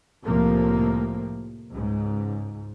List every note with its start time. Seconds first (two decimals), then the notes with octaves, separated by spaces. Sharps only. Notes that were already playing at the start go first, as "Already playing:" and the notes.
0.24 C2 A2 C3 F3 A#3
1.72 C#2 G#2